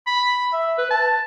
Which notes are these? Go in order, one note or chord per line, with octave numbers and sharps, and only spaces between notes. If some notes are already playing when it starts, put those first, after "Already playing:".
B5
E5
B4
A5